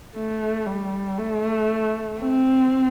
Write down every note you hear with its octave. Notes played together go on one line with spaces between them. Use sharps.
A3
G3
A3
C4